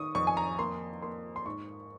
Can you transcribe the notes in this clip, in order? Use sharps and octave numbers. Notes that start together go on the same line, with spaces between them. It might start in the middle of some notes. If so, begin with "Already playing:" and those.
Already playing: D#3 C#6 D#6
F2 C#6
G#5
A#5
A#3 C6
A#3 C6
C6
G#2 C#6